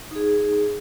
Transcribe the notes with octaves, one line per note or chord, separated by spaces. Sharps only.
D#4 G#4